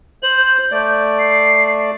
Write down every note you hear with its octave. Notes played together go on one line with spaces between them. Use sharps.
C5 F#7
G6
A3 D5
C7